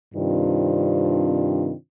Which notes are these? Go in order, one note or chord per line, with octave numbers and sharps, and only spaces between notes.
G2 C3 D#3 C4 D4 F4